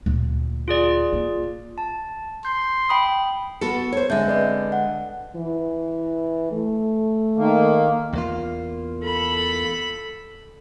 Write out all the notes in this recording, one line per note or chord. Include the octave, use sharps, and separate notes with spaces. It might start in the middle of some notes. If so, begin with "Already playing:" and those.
D2 A#2
F4 G#4 D5
A#3
A5
C6 G6
G5 B5 D#6
B3 F#4 A4 C#7
C5 C#5
D3 G#3 C4 E5 G6
B4 D5 D#5
F#5
E3
A3
D#3 A#3
E2 A#3 F4
A4 B5